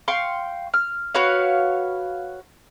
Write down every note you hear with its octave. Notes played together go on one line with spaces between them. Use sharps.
F5 G5 C6 C#6
F6
F#4 B4 C#5 F5